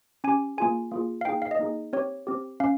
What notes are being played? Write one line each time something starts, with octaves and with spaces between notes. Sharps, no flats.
C#4 G4 G#5
A#3 F4 G#4 G#5
A#3 F4 G#4
F5
A#3 D#4 G#4 G5
F5
D#5
A#3 D#4 G#4
C4 G4 C#5
C4 G4
C#4 F5